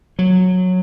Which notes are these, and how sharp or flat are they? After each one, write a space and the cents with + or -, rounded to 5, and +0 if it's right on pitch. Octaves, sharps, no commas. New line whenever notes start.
F#3 -10